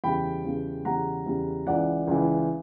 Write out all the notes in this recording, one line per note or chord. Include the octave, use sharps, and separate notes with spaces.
E2 C#3 G3 G5 B5
E2 C#3 G3
E2 C#3 G3 F#5 A#5
E2 C#3 G3
C#2 C#3 E3 D5 F#5
C#2 C#3 E3